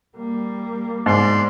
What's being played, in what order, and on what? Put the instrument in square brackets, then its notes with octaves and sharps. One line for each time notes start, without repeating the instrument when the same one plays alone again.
[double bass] G3 A#3
[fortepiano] G#2 [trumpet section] D5 C6